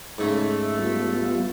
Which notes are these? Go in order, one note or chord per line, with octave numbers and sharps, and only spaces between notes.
G#2 C#3 A3
G3 B3 F4